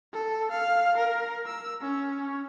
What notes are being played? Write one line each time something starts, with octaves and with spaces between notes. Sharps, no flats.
A4
F5
A#4
E6
C#4